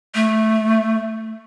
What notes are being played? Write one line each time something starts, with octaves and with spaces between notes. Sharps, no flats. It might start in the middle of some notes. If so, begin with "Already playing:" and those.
A3